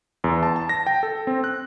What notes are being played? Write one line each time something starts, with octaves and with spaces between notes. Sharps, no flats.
E2
A5
A5
A#6
G5
A4
C4
F#6